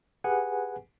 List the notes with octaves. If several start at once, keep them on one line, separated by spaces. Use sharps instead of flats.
G4 G#4 B4 F#5 G#5